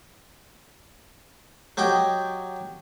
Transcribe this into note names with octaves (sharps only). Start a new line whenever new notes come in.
F#3 G4 D#5 G5